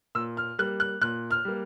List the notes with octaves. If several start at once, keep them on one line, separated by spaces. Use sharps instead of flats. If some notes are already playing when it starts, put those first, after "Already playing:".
A#2 E6
F6
G3 A#3 F#6
F#6
A#2 F#6
F6
G3 A#3